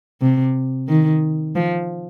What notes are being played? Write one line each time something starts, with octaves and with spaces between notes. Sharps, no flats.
C3
D#3
F3